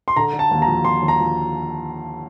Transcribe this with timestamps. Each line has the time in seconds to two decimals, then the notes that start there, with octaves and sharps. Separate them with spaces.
0.08 C6
0.16 D3 A#5
0.33 D3
0.39 A5
0.51 D#2
0.62 A#5
0.68 F3
0.84 F3 C6
1.03 D#2
1.08 A#5
1.19 F3